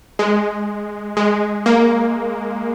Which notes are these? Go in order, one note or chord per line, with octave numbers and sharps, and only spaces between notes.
G#3
G#3
A#3